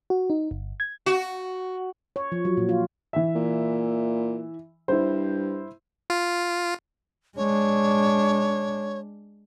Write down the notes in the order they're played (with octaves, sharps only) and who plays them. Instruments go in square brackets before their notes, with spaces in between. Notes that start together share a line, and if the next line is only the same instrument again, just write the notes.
[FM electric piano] F#4
D#4
G1
G#6
[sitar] F#4
[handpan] C#5
F3
F#3
A#2
F4
[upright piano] E3 E5
[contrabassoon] A#2
[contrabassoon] G2 [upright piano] E4 C5
[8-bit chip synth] F4
[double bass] G#3 D4 [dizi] C#5